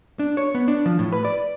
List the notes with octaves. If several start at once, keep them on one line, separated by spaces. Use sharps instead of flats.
D4
C#5
B3
D4
F3
A2
B4
D5